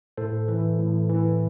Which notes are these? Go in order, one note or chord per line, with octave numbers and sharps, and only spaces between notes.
A2 A4 C5
E3
A2
E3